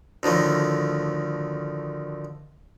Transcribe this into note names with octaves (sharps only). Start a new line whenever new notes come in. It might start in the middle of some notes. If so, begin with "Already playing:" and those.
D2 A2 D#3 F3